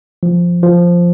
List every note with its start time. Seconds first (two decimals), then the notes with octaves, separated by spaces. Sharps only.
0.23 F3
0.63 F3